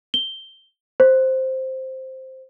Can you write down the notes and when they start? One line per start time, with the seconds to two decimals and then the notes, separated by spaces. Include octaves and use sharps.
0.14 G7
1.00 C5